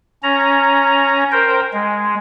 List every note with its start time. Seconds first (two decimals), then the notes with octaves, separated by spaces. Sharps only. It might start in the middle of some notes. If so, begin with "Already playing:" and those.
0.23 C#4 A#5
1.32 A#4 C5 G5
1.74 G#3